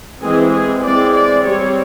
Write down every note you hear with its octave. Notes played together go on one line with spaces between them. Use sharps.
E3 G#3 C4 G#4
G#4
E3 G#3 C4 D5
D5
G3 C4 C#5